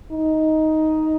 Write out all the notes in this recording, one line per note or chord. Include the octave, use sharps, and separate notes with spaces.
D#4